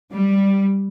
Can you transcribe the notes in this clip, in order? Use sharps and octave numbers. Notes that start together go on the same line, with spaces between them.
G3